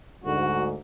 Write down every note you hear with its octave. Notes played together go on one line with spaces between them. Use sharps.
D2 G#2 F#4